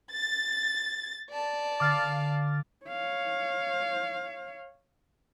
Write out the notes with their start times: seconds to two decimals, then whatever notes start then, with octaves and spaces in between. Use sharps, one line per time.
0.14 A6
1.31 D5 A5
1.80 D3 F5 D6 F6 A6
2.86 C#5 F5